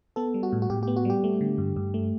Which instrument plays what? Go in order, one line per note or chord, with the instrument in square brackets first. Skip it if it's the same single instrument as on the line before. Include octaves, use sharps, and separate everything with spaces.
[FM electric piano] B3 A4
G3
F#4
A2
F#4
A2 G4
B3 G4
F#4
G3 G4
A3
D3
G2
G2
A3